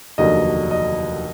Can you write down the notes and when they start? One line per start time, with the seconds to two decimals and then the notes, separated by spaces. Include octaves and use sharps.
0.18 F1 D#2 D3 F#3 D#5
0.71 D#5